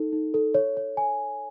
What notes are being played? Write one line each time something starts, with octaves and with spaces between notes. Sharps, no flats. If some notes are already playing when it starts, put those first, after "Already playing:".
Already playing: D#4 A4
D#4
A4
C#5
C#5
G#5